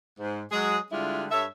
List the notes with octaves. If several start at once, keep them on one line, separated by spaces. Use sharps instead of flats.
G#2
F#3 G#3 G#4
D3 G3 G#3 D4 E4 F4
G2 A4 C#5 E5